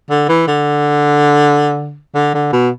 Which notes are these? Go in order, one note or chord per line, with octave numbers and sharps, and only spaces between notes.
D3
E3
D3
D3
D3
B2